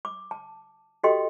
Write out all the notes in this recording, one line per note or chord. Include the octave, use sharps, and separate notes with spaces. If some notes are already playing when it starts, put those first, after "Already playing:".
D6
A5
F#4 G4 A4 D#5 G5 C6